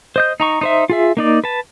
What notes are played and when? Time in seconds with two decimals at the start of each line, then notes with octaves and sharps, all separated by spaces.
0.16 C5 D#5 G6
0.40 D#4 A#5 C#6
0.61 D#4 C5 E5
0.90 F4 G#4 E5
1.17 A#3 D#4 D5
1.44 B4 A5